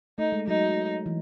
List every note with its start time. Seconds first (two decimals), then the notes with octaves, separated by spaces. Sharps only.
0.18 A3 D#4
0.32 G#3
0.47 F#3 D#4
1.06 E3